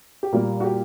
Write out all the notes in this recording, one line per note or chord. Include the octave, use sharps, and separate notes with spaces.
G4
A#2 G3 A#3 A#4
F#4
G4